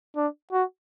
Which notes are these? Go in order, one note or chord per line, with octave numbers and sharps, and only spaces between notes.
D4
F#4